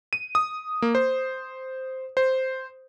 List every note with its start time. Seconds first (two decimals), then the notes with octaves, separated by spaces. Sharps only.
0.13 D#7
0.35 D#6
0.82 A#3
0.95 C5
2.17 C5